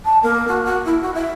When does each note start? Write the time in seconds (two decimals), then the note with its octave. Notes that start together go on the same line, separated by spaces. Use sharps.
0.05 A5
0.22 A#3
0.48 F#4
0.65 F#4
0.85 E4
1.01 F#4
1.14 E5